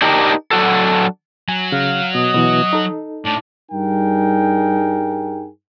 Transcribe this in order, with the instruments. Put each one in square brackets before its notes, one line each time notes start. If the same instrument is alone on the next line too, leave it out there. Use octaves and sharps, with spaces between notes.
[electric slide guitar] D4 D#4 G4 A#4
F#3 D4 F#4 A4
[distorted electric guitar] F#3 [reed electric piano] G#5
[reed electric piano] C#3 [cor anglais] F5
[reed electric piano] B2 [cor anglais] D#5
[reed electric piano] B2 E3
D#4 A4
[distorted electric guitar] A2 [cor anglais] D4
[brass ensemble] G2 G3 D#4 G#4 A#4 G5